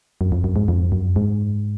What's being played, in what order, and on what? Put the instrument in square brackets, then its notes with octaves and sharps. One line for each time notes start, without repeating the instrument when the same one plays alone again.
[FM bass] F#2
F2
F#2
G#2
F2
F#2
G#2